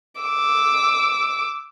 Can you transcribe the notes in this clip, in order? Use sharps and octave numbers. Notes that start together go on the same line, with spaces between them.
D6 E6